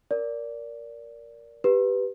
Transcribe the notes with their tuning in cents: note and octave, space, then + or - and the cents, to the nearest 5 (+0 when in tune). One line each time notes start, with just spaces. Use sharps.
A#4 +5 D5 -15
G4 +0 B4 +0